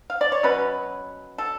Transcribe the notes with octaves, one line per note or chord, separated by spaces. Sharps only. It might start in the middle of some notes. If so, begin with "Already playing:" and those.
F5
D5
C#5
B2 F#3 C#4 B4
A4